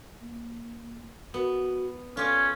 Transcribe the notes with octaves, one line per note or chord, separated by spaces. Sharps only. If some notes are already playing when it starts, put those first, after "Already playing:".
A#3
B3 F#4
C#4 F4 G4 A4